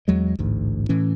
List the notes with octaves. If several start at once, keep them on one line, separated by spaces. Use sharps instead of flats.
E2 F#3 G#3
A1 D2 G#2
A2 E3 C#4